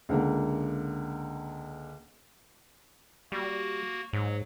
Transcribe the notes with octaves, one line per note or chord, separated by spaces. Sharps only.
C#2 D3 A#3
G3 A#3 F#4
G#2 F#3